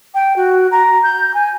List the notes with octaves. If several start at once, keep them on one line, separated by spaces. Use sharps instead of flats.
G5
F#4
A#5
G6
G#5